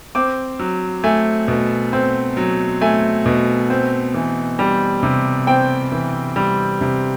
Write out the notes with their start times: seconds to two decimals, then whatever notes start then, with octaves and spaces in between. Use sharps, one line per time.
0.15 C4 D6
0.59 F#3
1.04 A3 G#5
1.48 B2
1.93 C4
2.37 F#3
2.81 A3 G#5
3.26 B2
3.70 C4
4.14 E3
4.59 G3
5.03 C3
5.47 C4 G5
5.92 E3
6.36 G3
6.81 C3